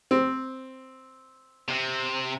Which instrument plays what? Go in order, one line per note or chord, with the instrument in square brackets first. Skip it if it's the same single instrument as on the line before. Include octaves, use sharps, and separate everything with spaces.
[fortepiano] C4
[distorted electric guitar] C3